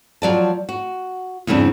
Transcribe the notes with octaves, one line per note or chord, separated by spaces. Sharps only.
F3 F#3 D5 A5
F#4
E2 G2 C#3 C4 D4